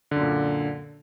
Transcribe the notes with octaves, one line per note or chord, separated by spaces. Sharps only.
F#2 A#2 D3